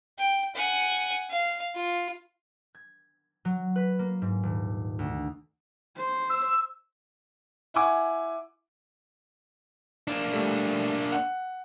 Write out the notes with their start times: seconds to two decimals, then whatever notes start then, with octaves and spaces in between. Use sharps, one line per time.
0.19 G5
0.55 F#5 G#5
1.30 F5
1.75 F4
2.75 G#6
3.45 F#3
3.76 B4
3.99 A#3
4.22 G#2
4.43 D#1
4.99 D2
5.96 C5
6.30 E6
7.74 E4 F#5 G#5 D6
10.08 A#3 D4
10.33 G3 A3
11.12 F#5